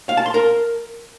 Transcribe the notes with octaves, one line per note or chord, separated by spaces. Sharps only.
F5
A5
C6
A#4